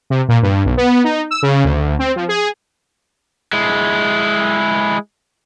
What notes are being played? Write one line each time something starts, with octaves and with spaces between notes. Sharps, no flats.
C3
A#2
G2
B1
B3
D#4
E6
C#3
D2
C4
F3
G#4
G#3 E4